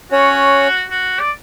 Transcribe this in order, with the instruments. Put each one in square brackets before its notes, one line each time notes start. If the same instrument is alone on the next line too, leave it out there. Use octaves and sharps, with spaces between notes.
[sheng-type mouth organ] C#4 C#5 [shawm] F#4
[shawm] F#4
D5